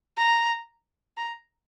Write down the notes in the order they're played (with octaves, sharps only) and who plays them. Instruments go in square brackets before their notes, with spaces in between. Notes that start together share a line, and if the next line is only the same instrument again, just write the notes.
[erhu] A#5
A#5